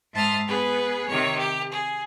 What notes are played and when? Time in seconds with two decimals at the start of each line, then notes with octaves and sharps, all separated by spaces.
0.13 G#2 E5 A5 C6 D#6 F6
0.47 B3 G#4 B4
1.08 C3 D#3 C#5
1.38 G4
1.72 G#4